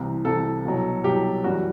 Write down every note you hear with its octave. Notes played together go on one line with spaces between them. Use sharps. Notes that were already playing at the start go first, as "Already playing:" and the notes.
Already playing: C2 C3 E3
C2 C3 E3 A4
C2 B2 F#3
C2 B2 F#3 G4
F#2 E3 G3 F#4